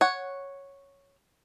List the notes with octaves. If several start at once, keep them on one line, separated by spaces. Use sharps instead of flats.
C#5 F#5